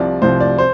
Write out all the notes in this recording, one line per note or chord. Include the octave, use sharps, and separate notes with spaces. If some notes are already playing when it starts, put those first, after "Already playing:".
Already playing: C2 C3 F3 D5
C2 C3 F3 C5
D5
C5